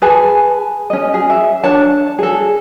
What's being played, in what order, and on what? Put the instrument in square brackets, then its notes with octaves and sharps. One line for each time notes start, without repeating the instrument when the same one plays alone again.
[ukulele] G#4 B4 G#5 A5
C#4 D#5
G#4
E5
D4 C#5 A5
G#4 A4